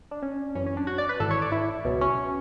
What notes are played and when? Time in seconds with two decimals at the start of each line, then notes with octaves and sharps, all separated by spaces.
0.11 D4
0.22 C#4
0.55 F#2 E3 C#4
0.66 C#4
0.77 D4
0.87 F#4
0.98 D5
1.09 B4
1.20 G#1 G#2 E3 A4
1.31 C#5
1.42 D5
1.52 E4
1.84 C#2 B2 F#3
2.01 C#4